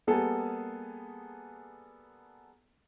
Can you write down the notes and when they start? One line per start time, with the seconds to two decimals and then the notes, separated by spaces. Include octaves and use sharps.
0.07 G3 A#3 B3 G#4 A4